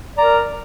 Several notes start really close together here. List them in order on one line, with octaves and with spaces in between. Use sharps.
D5 A#5 A#4